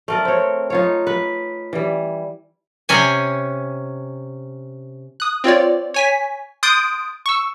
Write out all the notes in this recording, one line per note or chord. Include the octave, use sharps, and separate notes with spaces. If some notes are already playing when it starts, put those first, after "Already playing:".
A3 A#4 D5
C4 C#5
D#4 F4 C#5
B4
E3 G3
C3 C#4 G#5
D#6 F#6
C4 F4 C#5 D5
C#5 G#5 B6
C6 D#6 F#6 G6 A6 D7
C#6 E6